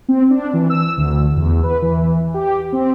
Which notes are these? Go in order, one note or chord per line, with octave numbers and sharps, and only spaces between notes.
C4
D4
E3
E6
D2
E2
B4
E3
G4
C4